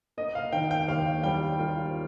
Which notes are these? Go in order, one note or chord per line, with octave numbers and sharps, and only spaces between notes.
A#3 D#5
F5
D#3 G5
G5
D#2 F5
G3 G5
A#3 F4